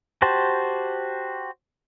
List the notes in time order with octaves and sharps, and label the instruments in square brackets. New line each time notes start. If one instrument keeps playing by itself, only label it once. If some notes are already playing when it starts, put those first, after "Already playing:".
[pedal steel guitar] F#4 G4 C5 A5